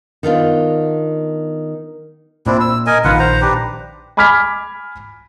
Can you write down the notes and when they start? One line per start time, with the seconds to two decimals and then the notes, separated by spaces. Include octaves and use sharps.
0.23 D#3 B3 D4 F4
2.47 A#2 C4 D4 E4
2.60 E6
2.86 A#4 D#5 G#5
3.05 A#1 D#3 F4 B4 F#5
3.19 C5 A#5
3.42 D4 G4 B4
4.17 G#5 B5 D6 F6 G#6 B6